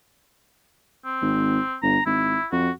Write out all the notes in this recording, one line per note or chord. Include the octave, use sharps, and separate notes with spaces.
C4
G#1
G1 A#5
G#1 E4
F2 F#4